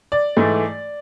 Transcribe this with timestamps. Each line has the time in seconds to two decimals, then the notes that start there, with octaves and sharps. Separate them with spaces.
0.12 D5
0.37 G#2 E3 A3